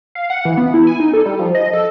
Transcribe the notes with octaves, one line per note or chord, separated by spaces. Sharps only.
F5
F#5
E3
B3
E4
G#5
D#4
A4
G3
F3
D#5
A4